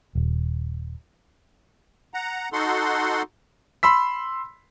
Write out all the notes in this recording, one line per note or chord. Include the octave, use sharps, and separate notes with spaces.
D#1
F#5 A#5
D#4 F#4 A4 F#5 C6
B5 C6 E6 B6